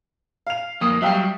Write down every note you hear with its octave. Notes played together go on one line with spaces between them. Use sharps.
F5 F7
F2 A#3 D#6
F#3 G3 E5 F5 G5